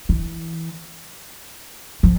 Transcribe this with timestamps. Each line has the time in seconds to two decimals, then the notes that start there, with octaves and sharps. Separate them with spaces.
0.09 E3
2.03 F3